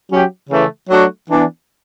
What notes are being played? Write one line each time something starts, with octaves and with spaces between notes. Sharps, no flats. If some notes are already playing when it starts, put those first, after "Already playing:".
F#3 C#4 G4
C#3 E3 A3
F#3 A3 D4 F#4
E3 B3 D4